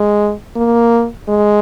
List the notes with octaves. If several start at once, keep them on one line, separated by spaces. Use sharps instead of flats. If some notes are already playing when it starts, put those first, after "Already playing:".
Already playing: G#3
A#3
G#3